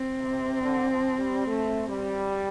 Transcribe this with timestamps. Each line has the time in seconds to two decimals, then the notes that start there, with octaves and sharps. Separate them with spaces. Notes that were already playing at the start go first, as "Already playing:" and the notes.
Already playing: C4
0.20 C3
0.62 D3
0.90 F3
1.18 G3
1.46 A3
1.89 G3